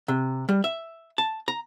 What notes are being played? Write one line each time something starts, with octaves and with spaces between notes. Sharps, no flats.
C3
G3
E5
A5
A#5